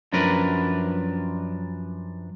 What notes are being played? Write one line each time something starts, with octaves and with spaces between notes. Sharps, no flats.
F#2 F3 D4 A#4 B4